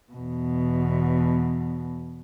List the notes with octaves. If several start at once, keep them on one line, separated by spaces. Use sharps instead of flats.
E2 B2